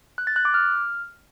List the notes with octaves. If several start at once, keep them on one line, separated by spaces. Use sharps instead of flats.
F#6
A6
F#6
D6
F6